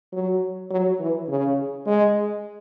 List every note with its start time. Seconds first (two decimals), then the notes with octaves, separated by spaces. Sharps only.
0.13 F#3
0.70 F#3
1.00 E3
1.28 C#3
1.87 G#3